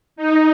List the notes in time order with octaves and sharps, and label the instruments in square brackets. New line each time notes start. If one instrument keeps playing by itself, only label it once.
[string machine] D#4